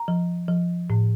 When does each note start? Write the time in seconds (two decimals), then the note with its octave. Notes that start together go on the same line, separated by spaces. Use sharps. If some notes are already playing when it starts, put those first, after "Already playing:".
Already playing: A#5
0.08 F3
0.48 F3
0.90 A2